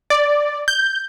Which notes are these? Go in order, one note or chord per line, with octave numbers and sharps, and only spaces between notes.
D5
G6